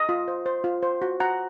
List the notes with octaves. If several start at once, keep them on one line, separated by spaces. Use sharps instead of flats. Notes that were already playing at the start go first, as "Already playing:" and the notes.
Already playing: D#5
F4
C5
C5
F4
C5
F#4
F#4 F#5 A#5